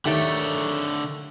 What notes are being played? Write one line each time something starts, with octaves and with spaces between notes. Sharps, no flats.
D3 D#3 A3 G4 C#5